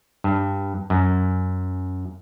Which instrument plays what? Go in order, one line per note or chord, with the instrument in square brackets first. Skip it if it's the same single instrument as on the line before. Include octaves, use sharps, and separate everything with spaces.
[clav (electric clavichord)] G2
F#2